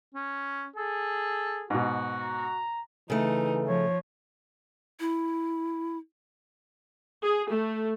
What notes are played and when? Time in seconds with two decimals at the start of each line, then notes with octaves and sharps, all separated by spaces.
0.14 C#4
0.76 G#4 A4
1.70 G#2 B2 F#4
2.23 A#5
3.10 C#3 E3 A3 D#4
3.67 F3 C#5
5.00 E4
7.23 G#4
7.52 A3